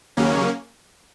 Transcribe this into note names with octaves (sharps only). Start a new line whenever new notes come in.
D#2 C#3 F#3 A#3 C#4